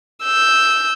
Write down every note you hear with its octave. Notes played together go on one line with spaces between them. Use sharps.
E6 G6